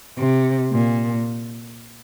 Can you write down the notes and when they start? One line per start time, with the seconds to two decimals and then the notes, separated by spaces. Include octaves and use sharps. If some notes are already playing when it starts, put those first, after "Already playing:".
0.18 C3
0.72 A#2